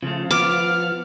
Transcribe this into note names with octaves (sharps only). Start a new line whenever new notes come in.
C#3 F3 A3 F4
B3 D6 F6